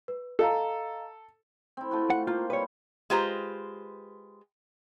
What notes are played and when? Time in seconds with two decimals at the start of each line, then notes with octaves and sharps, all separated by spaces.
0.08 B4
0.39 A4 D#5 F5 A#5
1.77 C4 E4
1.91 A3 F4 F#4
2.10 F#5
2.27 A#3 F4 C5
2.50 G3 B4 C#5
3.10 G#3 F4 G4 B4 C5 A#5